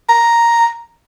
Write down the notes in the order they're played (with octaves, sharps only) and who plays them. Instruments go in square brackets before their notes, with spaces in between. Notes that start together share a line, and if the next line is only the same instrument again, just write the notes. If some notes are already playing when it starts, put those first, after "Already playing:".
[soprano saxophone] A#5